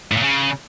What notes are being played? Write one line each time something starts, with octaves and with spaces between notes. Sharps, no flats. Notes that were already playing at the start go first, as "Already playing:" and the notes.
A2
A#2
C#3